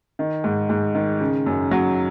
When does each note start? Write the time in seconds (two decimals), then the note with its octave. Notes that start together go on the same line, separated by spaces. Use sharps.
0.19 D#3
0.44 G#2
0.70 G#2
0.95 D#3
1.20 C#3
1.46 F#2
1.71 F#3